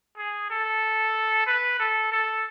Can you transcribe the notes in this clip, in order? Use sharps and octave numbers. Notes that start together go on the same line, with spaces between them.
G#4
A4
B4
A4
A4